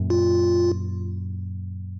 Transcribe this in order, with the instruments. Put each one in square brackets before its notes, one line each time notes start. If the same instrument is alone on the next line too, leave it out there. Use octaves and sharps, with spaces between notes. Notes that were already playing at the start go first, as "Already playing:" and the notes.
Already playing: [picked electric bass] F#2 A#2
[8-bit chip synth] F4